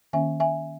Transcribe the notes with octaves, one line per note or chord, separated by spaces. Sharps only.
D#3 A#3 C#4 E5 G#5
E5 G#5